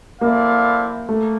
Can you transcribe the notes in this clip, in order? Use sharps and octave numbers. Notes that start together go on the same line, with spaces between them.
A#3 C4 E4 A4 D5 F5
A3 A#3